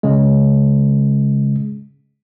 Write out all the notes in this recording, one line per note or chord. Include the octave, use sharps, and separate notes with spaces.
C#3 G#3